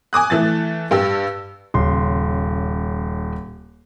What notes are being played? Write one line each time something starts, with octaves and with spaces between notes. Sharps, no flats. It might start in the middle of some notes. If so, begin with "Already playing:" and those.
G#5 D6 D#6 F#6
E3 A3 A6
G2 G4 E6
D#1 C#3 C6